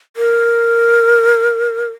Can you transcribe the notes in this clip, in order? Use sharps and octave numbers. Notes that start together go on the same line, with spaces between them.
A#4